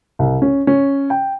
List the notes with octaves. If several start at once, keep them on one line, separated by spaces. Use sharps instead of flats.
C2
C#4
C#4
G5